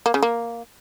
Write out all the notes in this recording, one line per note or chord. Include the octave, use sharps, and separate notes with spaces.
A#3
C#3
A#3